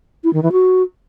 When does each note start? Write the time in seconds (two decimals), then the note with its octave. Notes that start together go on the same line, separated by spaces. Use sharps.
0.24 E4
0.33 D#3
0.43 E3
0.52 F#4